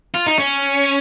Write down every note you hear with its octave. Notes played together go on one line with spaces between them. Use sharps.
F4
D#4
C#4